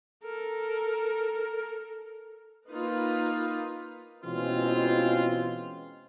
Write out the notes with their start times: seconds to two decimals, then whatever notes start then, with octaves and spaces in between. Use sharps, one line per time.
0.24 A4 A#4
2.67 A#3 D#4 F4 B4
4.24 B2 E3 G#3 C4 C#4 F4